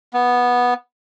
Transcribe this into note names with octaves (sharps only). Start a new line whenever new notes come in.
B3